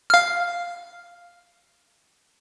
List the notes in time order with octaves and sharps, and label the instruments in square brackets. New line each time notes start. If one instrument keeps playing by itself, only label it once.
[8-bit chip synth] F5 F6